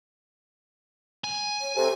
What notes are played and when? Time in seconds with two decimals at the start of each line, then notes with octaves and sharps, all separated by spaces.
1.24 G#5
1.61 C#5
1.76 C3 A4